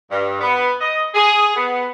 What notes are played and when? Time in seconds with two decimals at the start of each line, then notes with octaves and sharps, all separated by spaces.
0.11 G2
0.41 B3
0.81 D#5
1.15 G#4
1.56 B3